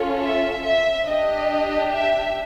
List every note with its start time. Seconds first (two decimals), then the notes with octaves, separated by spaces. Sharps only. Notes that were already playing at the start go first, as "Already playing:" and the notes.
Already playing: C#4 F4 A4
0.23 E5
0.65 E5
1.07 D4 G4 D#5
1.92 E5